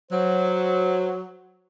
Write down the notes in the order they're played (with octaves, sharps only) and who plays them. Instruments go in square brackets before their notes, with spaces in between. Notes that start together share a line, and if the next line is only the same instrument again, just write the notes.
[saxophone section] F#3 [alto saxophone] C5